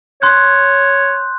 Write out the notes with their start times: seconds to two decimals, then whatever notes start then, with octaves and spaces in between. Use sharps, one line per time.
0.22 C#5 C6 F#6 G6